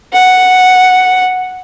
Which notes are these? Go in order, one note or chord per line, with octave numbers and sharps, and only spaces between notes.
F#5